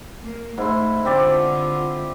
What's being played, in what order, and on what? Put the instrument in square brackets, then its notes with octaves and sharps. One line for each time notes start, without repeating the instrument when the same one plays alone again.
[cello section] A#3
[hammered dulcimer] G#2 E4 C6 [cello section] A3
[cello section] D3 F4 [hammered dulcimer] C4 G4 D5